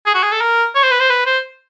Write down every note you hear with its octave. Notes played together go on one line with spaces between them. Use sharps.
G#4
F#4
G#4
A4
A#4
C#5
C5
B4
C5
B4
C5